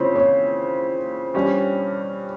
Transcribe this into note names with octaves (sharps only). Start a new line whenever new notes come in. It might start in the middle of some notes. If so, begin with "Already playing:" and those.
Already playing: C#3 C4 E4 F4 C5 C#5
C#5
G2 G3 C#4 G4